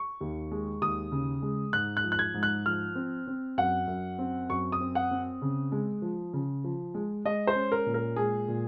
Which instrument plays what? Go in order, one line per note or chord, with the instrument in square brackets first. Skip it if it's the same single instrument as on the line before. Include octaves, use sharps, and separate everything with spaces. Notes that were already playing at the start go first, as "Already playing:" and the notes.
Already playing: [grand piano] C#6
D#2
G#3
D#2 D#6
C#3
G#3
G#2 F#6
F#6
F3
F#6
G#6
G#2
F#6
F3 F6
C4
C4
F#2 F#5
F#2
C4
F#2 C#6
D#6
C4
F#5
C4
C#3
G#3
F3
C#3
F3
G#3
G#3 D#5
C5
C#4
A#4
A#2
A#4
G#3 G#4
A#2